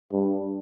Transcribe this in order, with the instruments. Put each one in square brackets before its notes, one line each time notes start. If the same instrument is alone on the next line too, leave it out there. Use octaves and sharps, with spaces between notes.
[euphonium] G2